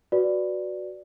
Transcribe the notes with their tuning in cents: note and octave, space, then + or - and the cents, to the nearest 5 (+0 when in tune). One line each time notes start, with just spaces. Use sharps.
F#4 +0 B4 +0 D5 +0